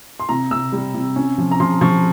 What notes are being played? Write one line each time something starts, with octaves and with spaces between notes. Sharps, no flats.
C6
C3 A#5
C3 E6
G3
C3
C#4
F3
A#5
F3 C6
F3 C#6